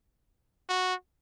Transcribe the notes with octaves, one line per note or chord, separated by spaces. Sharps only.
F#4